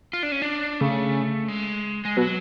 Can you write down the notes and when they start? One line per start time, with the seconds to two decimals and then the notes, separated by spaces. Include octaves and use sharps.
0.13 F4
0.23 D4
0.32 C#4
0.42 D4
0.81 C#3 A3
1.48 G#3
2.05 G#3
2.17 B2 F#3